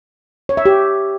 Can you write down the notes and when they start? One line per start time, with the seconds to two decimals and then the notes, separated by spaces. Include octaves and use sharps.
0.49 C#5
0.57 E5
0.65 G4